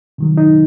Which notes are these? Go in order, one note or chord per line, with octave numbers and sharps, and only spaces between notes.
C3 D#3 F#3
D#4